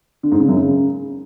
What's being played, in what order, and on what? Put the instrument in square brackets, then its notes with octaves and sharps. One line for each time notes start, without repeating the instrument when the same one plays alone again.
[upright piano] D3
G#2
C#3
F#2
C#3